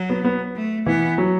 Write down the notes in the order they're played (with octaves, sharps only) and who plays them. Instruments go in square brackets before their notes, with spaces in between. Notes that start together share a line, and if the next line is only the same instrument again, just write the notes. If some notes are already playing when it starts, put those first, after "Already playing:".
Already playing: [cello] F#3
[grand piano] B3
B3
[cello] A3
[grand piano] E3 [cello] B3
[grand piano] F#3